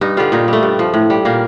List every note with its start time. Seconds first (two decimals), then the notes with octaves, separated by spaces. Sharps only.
0.01 G2 D#4
0.17 D3 G3 F4
0.32 A#2 D#4
0.48 G3 A3
0.63 G2
0.79 F3
0.94 A2
1.10 G3
1.25 A#2 A#3